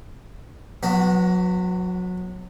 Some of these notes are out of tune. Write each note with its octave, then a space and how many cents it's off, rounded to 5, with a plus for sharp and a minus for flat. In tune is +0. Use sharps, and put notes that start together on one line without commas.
F#3 -30 B3 +0 F#4 +30